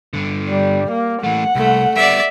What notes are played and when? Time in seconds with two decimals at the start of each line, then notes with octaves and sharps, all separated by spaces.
0.13 G2 D3
0.50 G3
0.91 A#3
1.24 E3 A3 F#5
1.55 C2 A3
1.96 G3 B3 D5 E5